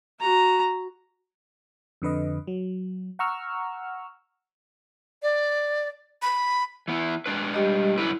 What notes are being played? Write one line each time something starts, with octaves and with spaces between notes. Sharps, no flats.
F#4 A#5
F2 D3 B4 D#5
F#3
F#5 A#5 C#6 E6 F6
D5
B5
E3 B3 E4
G#3 D4 B4
G3 G4 D#5
F#2 D3 E4 B4